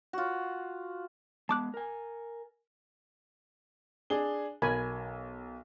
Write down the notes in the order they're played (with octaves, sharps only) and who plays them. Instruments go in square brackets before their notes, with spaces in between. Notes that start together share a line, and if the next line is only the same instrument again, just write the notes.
[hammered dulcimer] F4 F#4
[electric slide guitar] G#3 B3 [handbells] A5 D6 F#6
[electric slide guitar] A#4 G#5
[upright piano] D4 G#4 G7
[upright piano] B1 [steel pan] A#4 G#5 B5